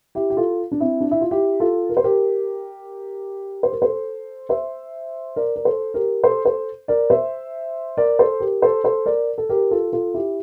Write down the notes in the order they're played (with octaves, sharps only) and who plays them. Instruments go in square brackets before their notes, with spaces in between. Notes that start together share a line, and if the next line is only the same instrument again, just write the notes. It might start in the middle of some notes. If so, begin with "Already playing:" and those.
[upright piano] E4 G4
G4
F4 A4
D4
C4 E4
D4
E4
F4
E4 G4
F4 A4
A#4
C5
G4 A#4
C5
A#4
A4 C5
C5 E5
A#4 D5
A#4
A4 C5
G4 A#4
A4 C5
A4 C5
A#4 D5
C5 E5
A#4 D5
A4 C5
G4 A#4
A4 C5
A4 C5
A#4 D5
A4
G4 A#4
F4 A4
F4 A4
E4 G4